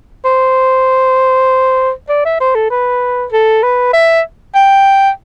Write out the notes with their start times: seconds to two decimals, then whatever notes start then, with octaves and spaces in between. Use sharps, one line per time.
0.25 C5
2.09 D5
2.25 E5
2.40 C5
2.55 A4
2.70 B4
3.32 A4
3.63 B4
3.93 E5
4.55 G5